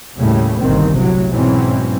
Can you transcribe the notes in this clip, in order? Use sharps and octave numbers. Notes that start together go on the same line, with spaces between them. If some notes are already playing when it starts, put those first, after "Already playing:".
D#2 A2 C#3 G3 A3
G1 C2 A#2 D#3 C4
A2 C3 F#3
G#2 B2 E3 F#3 C4 C#4